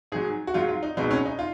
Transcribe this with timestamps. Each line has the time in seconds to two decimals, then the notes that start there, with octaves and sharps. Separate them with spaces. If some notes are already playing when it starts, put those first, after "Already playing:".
0.12 G#2 F#3 G#4
0.47 F#4
0.54 G#2 F#3 F4
0.68 F4
0.83 D#4
0.97 C#2 B2 F#3 D#4
1.11 C#4
1.25 D#4
1.39 F4